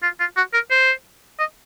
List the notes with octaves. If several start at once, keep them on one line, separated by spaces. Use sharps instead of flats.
F4
F4
F#4
A#4
C5
D#5